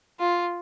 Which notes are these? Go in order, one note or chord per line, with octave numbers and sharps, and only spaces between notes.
F4